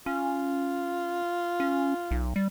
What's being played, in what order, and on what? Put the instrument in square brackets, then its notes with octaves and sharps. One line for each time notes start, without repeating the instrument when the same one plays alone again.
[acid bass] C#4 [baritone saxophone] F4
[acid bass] C#4
B1
G3